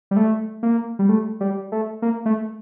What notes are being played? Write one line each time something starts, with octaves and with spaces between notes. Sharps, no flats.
G3
A3
A#3
G3
A3
G3
A3
A#3
A3